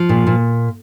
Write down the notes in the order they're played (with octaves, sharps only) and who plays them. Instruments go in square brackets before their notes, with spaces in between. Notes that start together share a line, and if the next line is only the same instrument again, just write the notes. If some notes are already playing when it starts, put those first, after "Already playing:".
Already playing: [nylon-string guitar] F3
A#2
A#2